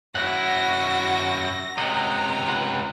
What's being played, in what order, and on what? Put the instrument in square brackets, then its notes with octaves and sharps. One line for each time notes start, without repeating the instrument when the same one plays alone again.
[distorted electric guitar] F#2 E4 [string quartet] F#4 A#6 [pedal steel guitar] F#5
[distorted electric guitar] C#2 C3 [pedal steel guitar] D#5 F#5 [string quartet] A#5
[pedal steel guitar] F4 B4 F#5